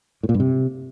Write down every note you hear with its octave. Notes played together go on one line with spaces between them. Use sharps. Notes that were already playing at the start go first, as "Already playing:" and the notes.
A2
A#2
G2
C3